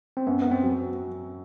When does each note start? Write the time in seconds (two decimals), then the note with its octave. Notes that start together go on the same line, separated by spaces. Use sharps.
0.17 C4
0.27 F#2 B3
0.42 F#2 B3
0.51 C4
0.63 F#3